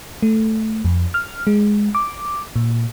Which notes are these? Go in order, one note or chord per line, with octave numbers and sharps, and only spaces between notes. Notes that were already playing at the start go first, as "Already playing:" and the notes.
A3
F2
F6
G#3
D6
A#2